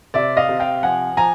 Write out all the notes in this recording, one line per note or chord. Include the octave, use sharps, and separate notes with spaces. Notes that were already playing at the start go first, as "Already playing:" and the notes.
C3 D5 E5
D#5 F5
C3
F5 G5
F3 F#5 G#5
F3 G#5 A#5